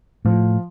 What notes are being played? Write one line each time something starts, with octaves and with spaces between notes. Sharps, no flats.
A2 F3